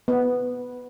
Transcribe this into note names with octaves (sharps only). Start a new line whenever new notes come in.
B3